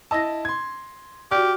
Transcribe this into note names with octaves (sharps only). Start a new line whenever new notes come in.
E4 D#5 A5 E6 A#6
C6 G#6
F#4 G4 D5 F6